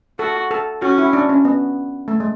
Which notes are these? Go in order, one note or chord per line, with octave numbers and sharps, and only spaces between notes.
F#4 A4
A4
C#4 F#4
E4
D4
C#4
B3
A3
G#3